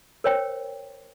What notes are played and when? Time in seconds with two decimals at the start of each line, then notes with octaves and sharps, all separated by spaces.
0.24 A#4 C5 C#5 G5